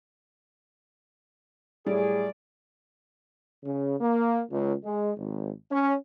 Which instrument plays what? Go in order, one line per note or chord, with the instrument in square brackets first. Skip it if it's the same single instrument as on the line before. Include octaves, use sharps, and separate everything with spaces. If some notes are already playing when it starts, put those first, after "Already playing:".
[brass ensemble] A2 G#4 [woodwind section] F#3 A3 D5 [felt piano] G3
[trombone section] C#3
A#3
C#2
G#3
G#1
C#4